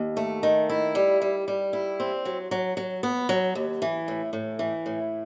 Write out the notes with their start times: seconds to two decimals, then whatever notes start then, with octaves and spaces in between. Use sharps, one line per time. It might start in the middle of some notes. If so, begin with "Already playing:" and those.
Already playing: D#2
0.17 A3
0.43 D#3
0.70 E4
0.95 G3
1.22 G3
1.48 G3
1.73 E4
2.00 C4
2.25 F#3
2.51 F#3
2.77 F#3
3.03 B3
3.29 F#3
3.55 D#2
3.82 E3
4.08 A2
4.33 A2
4.59 E3
4.86 A2